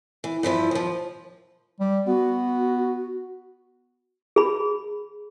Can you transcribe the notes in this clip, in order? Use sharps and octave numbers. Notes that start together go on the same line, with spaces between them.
E3
G2 E3 F3 E4
D#2 F3
G3
B3 F#4
G#4 B5